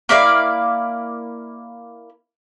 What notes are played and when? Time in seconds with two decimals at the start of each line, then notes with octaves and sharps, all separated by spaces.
0.09 A#3 E4 D5 F5